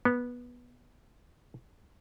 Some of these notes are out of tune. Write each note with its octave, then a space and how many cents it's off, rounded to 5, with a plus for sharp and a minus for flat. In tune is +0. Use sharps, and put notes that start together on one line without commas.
B3 -15